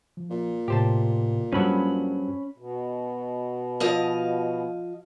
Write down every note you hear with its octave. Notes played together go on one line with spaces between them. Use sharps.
F3
A#2
A2 C3 G4 C5 A5
G2 F#3 C#4 C5 B5
B2
F3 D#5 F5